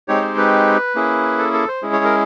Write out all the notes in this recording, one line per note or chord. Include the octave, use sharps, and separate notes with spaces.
G#3 C4 D#4 G4 C#5
C5
B4
A#3 C#4 E4 G#4
A4
A4
C5
G#3 C#4 E4 G#4
C#5
A#4